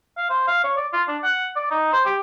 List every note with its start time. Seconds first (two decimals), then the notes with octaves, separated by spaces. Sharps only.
0.18 F5
0.29 C5
0.48 F5
0.64 C#5
0.77 D5
0.93 F4
1.08 D4
1.23 F#5
1.56 D5
1.71 D#4
1.93 C5
2.05 G4